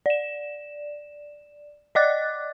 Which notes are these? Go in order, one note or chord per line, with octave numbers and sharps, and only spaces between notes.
D5 E7
D5 D#5 D6 F#6 A6